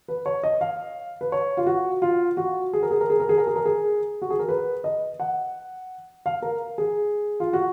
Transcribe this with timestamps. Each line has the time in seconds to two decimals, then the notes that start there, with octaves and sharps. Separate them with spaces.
0.08 B4
0.26 C#5
0.43 D#5
0.61 F5
1.21 B4
1.32 C#5
1.57 F4
1.66 F#4
2.02 F4
2.37 F#4
2.73 G#4
2.83 A#4
2.91 G#4
3.01 A#4
3.10 G#4
3.20 A#4
3.29 G#4
3.38 A#4
3.47 G#4
3.56 A#4
3.65 G#4
4.22 F#4
4.30 G#4
4.39 A#4
4.49 B4
4.84 D#5
5.20 F#5
6.26 F5
6.42 A#4
6.78 G#4
7.40 F4
7.53 F#4